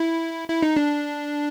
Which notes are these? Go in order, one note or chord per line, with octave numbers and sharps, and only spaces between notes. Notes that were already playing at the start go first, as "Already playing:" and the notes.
Already playing: E4
E4
D#4
D4